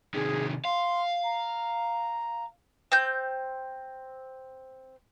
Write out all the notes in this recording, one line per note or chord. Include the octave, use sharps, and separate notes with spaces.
C3 D#3 G#4
F5 C6
A#5
C4 G6